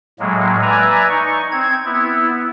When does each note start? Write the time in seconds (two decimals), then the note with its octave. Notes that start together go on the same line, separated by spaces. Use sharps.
0.19 A2 F#3 G#3 A#3
0.62 B4 D5 E5 G#5 A#5
1.09 D#4 C#6
1.52 C4 G#6
1.85 B3 E4